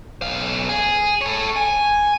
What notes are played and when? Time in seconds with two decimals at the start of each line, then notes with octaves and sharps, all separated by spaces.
0.22 B1 F5
0.69 G#4
1.21 A4 C#5
1.56 G#5